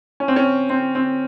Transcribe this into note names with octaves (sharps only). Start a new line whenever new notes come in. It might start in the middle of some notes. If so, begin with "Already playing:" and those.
C#4
C4
C#4
C4
C4